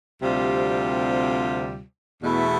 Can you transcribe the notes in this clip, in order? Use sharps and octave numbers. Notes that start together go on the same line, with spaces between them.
D2 C3 G3 C4 F4
E2 B2 A3 E4